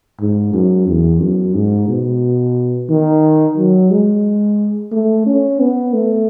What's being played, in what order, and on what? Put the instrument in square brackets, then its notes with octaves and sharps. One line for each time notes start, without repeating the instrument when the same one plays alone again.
[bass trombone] G#2
F#2
E2
F#2
G#2
B2
D#3
F#3
G#3
A3
C#4
B3
A3